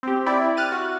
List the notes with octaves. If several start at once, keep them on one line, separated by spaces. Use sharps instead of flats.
C4 G4
E4 D5 G5
F6 F#6 A6 D#7
F#4